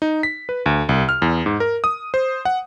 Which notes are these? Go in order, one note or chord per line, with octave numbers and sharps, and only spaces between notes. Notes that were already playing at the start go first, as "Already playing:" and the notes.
D#4
B6
B4
D2
C2
F6
E2
G#2
A#4
D#6
C5
F#5